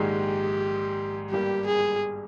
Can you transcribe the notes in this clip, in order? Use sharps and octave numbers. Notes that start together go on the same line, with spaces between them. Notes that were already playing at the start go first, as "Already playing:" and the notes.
Already playing: A#1 G#2 D#3 G#3 G4
G1 G2 G3 A#3 G4
G#4